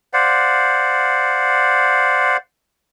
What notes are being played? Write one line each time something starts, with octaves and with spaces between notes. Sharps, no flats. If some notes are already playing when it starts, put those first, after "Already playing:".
C5 D5 F5 F#5